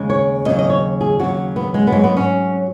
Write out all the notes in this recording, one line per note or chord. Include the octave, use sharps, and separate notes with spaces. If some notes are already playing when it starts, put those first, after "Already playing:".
Already playing: D#2 C#3 G#3
C#5
D#2 C#3 F#3 D#5
D#5
C#5
G#4
D#2 C#3 F#3 F#4
B3
G#3
B3
G#2 F#3 G#3
B3
C#4